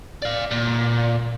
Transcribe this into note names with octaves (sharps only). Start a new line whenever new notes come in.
D5 F5
A#2